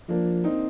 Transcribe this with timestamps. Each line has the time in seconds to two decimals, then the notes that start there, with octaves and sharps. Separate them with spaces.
0.09 F3 A#3 D4
0.44 C4 D#4